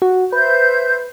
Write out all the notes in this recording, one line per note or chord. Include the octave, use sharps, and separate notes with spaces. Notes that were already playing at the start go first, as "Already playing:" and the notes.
F#4
B4 C5 E5 G6